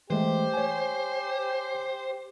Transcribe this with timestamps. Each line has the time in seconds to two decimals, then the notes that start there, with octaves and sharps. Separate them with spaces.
0.10 E3 G#3 A3 G4 C5
0.54 C#5 G#5